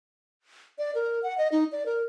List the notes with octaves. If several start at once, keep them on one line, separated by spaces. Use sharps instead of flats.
D5
A#4
F#5
D#5
D#4
D5
A#4